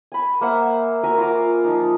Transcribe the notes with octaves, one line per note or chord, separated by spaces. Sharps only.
G#5 B5
A#3 C5 E5 F#5
F#4 A#4 E5 G#5
F4 A#5 D6
F3 D#4